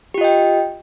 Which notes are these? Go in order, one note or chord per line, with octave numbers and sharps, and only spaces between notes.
F4 G4 D#5 G5